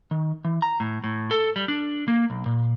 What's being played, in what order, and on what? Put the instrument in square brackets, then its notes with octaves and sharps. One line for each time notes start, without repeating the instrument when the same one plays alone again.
[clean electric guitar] D#3
E3
A#5
A2
A2
A4
G3
D4
A#3
B1
A#2